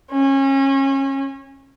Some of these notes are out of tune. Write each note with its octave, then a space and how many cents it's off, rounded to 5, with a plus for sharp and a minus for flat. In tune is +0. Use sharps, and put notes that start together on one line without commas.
C#4 -30